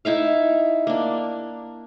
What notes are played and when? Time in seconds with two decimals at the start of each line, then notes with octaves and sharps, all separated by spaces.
0.05 D#4 E4 E5 F5
0.87 A#3 D4